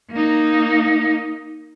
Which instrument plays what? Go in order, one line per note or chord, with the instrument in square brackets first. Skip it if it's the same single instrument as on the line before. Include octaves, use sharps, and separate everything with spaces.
[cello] A#3 D#4